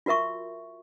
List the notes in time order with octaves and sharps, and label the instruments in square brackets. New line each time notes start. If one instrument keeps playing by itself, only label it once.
[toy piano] F4 F#4 A#4 E5 C#6